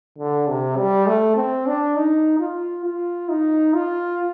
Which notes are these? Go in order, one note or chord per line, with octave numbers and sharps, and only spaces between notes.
D3
C3
G3
A3
C4
D4
D#4
F4
F4
D#4
F4